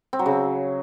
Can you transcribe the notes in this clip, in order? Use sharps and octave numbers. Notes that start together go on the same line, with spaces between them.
C4
F#3
C#3